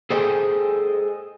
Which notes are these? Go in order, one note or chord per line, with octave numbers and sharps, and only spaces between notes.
G#4 A4 C5 D#5 G5 G#5